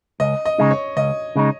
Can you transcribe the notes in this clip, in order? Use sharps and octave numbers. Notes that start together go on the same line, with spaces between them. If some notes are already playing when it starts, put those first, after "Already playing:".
C#2 D#5
D#5
C#3 G#3 D#4
C#5
C#2 D#5
C#3 G#3 D#4